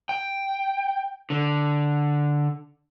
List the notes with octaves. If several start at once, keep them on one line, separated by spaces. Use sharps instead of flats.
G5
D3